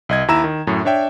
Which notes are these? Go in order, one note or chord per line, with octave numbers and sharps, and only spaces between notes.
C2 D#5 G#6
D#2 E4 A#5 E6 E7
D#3
F#2 A2
D4 C#5 E5 G5